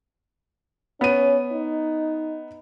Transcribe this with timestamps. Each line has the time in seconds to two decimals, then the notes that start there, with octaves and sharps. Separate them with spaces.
1.01 B3 C#4 D#7
1.52 D#4